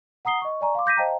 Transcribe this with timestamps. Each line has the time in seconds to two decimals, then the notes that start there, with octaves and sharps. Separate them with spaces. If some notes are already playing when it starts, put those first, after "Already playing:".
0.25 F#5 A#5 D#6 C7 G7
0.42 D#5 C#6
0.61 D5 G#5 A#5 C#6
0.75 F5 C6 D6
0.86 D6 G6 A#6 B6 D#7
0.97 C5 D#5 F5 G5 A5 A#5